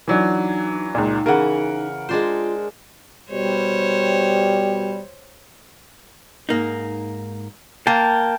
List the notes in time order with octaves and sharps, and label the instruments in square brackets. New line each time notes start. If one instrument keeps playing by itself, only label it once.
[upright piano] E3 F#3 D4 [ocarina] D#4
[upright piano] C#2 A#2 [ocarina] D#4
[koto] C#3 E3 [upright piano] A#4 F#5
[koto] G#3 D4 C5 [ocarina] F4
[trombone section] B2 G3 [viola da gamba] C5 C#5
[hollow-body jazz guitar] G#2 A#3 D#4
[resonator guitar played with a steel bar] A#3 [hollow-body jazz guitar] F5 [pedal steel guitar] G5 A5